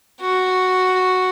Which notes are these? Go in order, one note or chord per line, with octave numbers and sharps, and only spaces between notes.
F#4